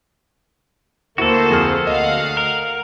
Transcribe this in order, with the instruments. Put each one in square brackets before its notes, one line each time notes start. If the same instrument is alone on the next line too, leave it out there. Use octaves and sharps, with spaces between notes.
[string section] D2 A#3 C5 [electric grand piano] E4 [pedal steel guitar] F#4 A4
[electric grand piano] F2 G#4 F6
[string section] D2 F5 F#5 [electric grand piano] D#5
[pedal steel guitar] A#4